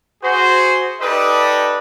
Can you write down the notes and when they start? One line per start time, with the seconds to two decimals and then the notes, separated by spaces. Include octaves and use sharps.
0.22 F#4 G#4 C5
1.01 D#4 G4 A4 B4 D5 D#5